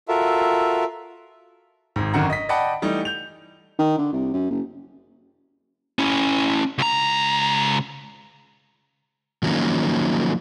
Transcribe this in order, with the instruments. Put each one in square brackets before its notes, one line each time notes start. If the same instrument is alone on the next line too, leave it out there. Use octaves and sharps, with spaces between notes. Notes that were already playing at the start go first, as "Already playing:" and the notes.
[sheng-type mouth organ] F4 F#4 A4 A#4 E5
[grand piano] G#1 G#2
G#1 F#2 D3 D#3 F#5 A#5
D#5 B6
D5 D#5 F#5 G5 A5 B5
E3 G3 A3 D#4
G6 F7
[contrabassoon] D#3
D3
C2
F#2
F#1
[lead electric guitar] C#4 E4
C#2 A#5
[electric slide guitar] D#3 F3 F#3 A#3 C#4 D#4